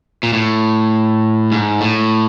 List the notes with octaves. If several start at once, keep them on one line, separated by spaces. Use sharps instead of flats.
A#2
A2
G#2
A2